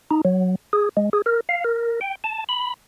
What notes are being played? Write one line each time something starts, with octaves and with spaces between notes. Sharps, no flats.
D#4
F#3
G#4
G#3
G#4
A#4
F5
A#4
G5
A5
B5